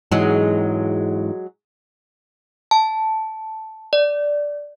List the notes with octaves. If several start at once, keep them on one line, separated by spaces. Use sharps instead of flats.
G#2 E3 F#3 G#3
A5
D5